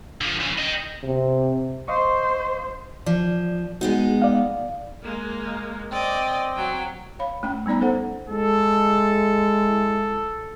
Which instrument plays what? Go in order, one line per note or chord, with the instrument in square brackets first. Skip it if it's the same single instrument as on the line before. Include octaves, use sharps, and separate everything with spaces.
[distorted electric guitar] D3 F3
C#3 E3
D#5 G5
[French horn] C3
[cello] C5 [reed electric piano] D#5 F5 C#6
[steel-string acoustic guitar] F3 [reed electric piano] D5
[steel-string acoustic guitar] G#3 B3 D#4 [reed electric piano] F#4
[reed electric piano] D5 F5
[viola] G#3 A#3
[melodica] C4 [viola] D5 D#5
[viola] F#3 G5
[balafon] C#5 F5 B5
A3 C#4 G5
G3 B3 D#4 D5 A#5
D#4 A4 C5 F#5
[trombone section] G#3 E4 [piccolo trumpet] A4